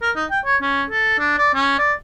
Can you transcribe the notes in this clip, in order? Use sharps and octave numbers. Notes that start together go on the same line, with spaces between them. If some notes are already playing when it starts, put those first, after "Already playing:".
A#4
D#4
G5
C#5
C#4
A4
D4
D5
C#4
D5